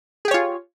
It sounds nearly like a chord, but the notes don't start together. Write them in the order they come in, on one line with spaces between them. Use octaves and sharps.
G#4 G4 C#5 F4